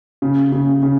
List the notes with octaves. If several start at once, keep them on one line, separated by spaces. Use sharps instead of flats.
C#3
C#3
C#3